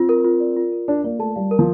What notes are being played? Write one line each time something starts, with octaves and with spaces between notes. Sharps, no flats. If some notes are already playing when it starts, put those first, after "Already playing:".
Already playing: C4 F4
A#4
F4
D5
F4
A#4
D4 A#4
A#3 D5
A3 A5
G3 F5
A#4
F3